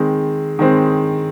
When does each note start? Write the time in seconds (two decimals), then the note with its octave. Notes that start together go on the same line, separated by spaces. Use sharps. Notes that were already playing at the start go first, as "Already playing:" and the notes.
Already playing: D#3 G#3 C4
0.59 D#3 G#3 C4